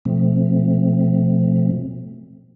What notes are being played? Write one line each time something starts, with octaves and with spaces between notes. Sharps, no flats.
B2 F3 A3 C4